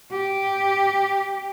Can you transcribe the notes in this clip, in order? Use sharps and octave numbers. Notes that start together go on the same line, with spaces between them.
G4